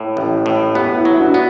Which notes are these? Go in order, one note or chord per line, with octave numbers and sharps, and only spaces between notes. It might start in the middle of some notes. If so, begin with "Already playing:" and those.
Already playing: A2
A1
A2
B3 G4 B4
E4
F#3
E4
D4 F#4
B3